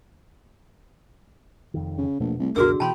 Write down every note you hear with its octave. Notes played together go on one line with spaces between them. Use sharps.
F1 F2 D#3
C#3
A#1 E2 B2 A3
C2 A3
C#2 F#2 B2 D3 F#4 G#4 A#4 E6
B2 E3 G5 A5 B5 C6